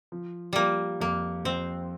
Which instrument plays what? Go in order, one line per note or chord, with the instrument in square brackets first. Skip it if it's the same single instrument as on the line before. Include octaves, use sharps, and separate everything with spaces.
[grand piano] F3
[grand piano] F3 [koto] G3 A#3
[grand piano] F2 [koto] A#3
[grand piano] F2 [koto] C4